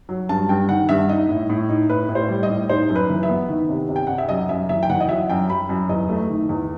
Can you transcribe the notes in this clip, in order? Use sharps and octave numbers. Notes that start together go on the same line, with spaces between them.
F#3
G2 A5
G2 G5
D#3 F#5
G2 E5
D#4 D#5
A2
A2
D#4
A2 B4
A2
C5
G3
D#5
A2
D#4 C5
F#2
B4
E3
E5
B3
D#3
C3
C3
G5
C3 F#5
E5
F#2 D#5
F#2 E5
E3 E5
G5
E3 F#5
D#5
F#3 E5
F#2 G5
F#2 B5
F#2
E2 D#5
A3
D#3
E2